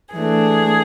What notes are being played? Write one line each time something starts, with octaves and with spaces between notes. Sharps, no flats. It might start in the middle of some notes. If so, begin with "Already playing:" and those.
E3 A3 D4 G#4